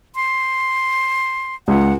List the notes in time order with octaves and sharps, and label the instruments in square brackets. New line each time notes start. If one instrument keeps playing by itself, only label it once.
[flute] C6
[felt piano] C#2 [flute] F#5